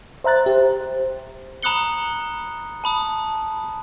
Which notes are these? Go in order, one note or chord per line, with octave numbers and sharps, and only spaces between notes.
C5 E5 A#5 F#6 A6
G4 C5
A#5 B5 D#6 F#6 C#7 G7
A5 B5 D#6